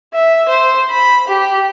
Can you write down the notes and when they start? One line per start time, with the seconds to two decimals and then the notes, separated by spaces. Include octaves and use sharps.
0.14 E5
0.49 C5
0.90 B5
1.28 G4